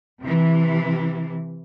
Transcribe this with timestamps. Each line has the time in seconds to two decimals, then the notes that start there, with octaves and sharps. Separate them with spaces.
0.21 C3 E3